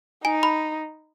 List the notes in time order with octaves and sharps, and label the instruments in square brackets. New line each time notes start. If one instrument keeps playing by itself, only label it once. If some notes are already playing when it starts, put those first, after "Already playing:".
[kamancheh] D#4 [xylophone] G#5
[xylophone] B5